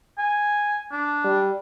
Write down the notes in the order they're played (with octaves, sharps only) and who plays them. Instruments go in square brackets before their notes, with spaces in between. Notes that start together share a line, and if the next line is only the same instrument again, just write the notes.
[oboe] G#5
D4
[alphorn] G3